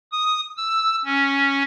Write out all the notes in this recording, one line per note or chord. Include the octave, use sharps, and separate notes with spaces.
D#6
E6
C#4